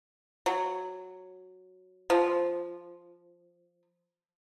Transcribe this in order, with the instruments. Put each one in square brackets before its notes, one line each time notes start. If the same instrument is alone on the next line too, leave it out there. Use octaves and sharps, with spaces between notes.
[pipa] F#3
F3